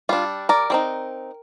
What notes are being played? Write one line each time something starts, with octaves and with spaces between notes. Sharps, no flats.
G3 D4 F4
A#4 D5
G3 C4 D#4